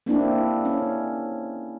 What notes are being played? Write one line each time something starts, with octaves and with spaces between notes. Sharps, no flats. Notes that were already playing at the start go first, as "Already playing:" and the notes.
A#3 C4 D4 E4
C#4